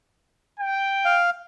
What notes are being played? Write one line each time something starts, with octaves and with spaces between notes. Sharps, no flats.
G5
F5